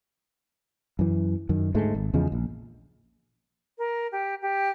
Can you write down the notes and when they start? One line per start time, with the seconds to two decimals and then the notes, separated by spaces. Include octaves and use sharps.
0.99 F#2 E3
1.49 F#2 D#3
1.74 D2 G#2 G#3 A3
1.95 G#1
2.14 E2 C#3 F3 G#3
2.32 A#1
3.78 A#4
4.12 G4
4.42 G4